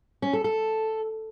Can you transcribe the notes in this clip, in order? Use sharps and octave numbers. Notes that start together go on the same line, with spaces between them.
C#4
A4
A4